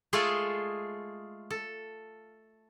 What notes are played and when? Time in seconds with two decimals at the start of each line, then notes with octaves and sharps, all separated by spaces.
0.13 G#3 A3 F4 G#4 A4
1.51 A4